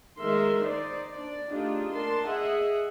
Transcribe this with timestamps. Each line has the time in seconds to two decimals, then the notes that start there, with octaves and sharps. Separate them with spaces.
0.19 D#3 G#3 A#4 E5 C6
0.64 D#4 C5 D5
1.13 D4 D5
1.51 A3 D4 D#4 F4 G4 G#4
1.94 D4 A#4 A5 C6
2.29 G#4 D#5 E5 F#5